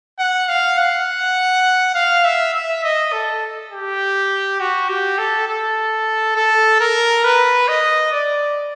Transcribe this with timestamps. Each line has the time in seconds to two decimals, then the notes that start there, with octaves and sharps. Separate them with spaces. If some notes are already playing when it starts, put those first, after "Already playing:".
0.19 F#5
0.49 F5
0.78 F#5
1.95 F5
2.25 E5
2.54 E5
2.84 D#5
3.13 A4
3.72 G4
4.60 F#4
4.89 G4
5.18 A4
5.48 A4
6.36 A4
6.80 A#4
7.24 B4
7.68 D#5
8.12 D5